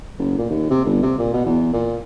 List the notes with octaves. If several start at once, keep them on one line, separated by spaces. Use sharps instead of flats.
F#1
A#2
D#2
C3
G1
C3
A#2
B2
E2
A#2